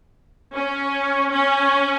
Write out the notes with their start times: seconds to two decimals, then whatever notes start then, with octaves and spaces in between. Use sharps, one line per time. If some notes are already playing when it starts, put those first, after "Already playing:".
0.55 C#4
1.32 C#4